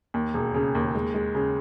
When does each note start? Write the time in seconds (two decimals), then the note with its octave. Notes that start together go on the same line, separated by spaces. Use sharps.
0.14 D#2
0.34 E1
0.54 C#3
0.75 D#2
0.95 G#3
1.14 G#3
1.35 C#3